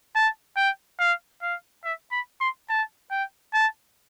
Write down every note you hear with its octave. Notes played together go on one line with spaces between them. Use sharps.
A5
G5
F5
F5
E5
B5
C6
A5
G5
A5